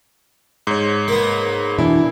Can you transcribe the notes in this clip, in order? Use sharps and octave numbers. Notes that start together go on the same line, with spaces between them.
G#2 C#5
A#3 B3
B2 E3 D4 E4